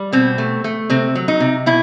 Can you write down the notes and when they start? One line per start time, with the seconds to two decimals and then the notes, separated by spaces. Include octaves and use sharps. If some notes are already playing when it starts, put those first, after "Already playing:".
Already playing: G3
0.12 B2 C4
0.38 A3
0.64 A3
0.90 C3 C4
1.15 F#3
1.28 D#4
1.40 C3
1.66 B2 E4